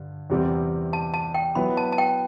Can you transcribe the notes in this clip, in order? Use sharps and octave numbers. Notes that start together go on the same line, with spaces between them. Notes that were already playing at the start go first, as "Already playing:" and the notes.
Already playing: G2 D3
E2 C3 G3 C4 G4
A5
A5
G5
F#3 B3 E4 B4 B5
A5
A5
G5